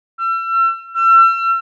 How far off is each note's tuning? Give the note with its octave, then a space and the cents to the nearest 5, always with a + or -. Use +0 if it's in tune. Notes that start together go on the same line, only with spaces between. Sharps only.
E6 +40
E6 +40